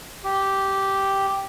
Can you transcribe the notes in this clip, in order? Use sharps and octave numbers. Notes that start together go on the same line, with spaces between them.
G4